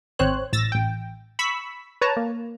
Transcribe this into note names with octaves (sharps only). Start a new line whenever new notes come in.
G#1 C4 C5 C#5 F#6
A1 E6 A6 A#6
A1 G5
B5 C#6 E6 B6
B4 C#5 A5 A#5
A#3